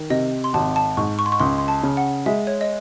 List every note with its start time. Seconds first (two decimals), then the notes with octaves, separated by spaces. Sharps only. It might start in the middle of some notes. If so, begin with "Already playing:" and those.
Already playing: D#3
0.10 C3 D#5
0.44 C6
0.54 G#1 A5
0.76 A5
0.97 G#2 C#6
1.19 C#6
1.26 C6
1.32 C#6
1.40 C#2 C6
1.58 C6
1.68 A5
1.83 C#3
1.97 F#5
2.26 G#3 E5
2.47 C#5
2.61 D#5